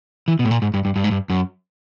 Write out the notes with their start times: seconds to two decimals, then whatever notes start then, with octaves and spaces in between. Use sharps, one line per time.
0.28 E3
0.39 B2
0.45 A2
0.51 A#2
0.62 G#2
0.74 G2
0.85 G2
0.96 G2
1.04 G#2
1.11 G2
1.30 F#2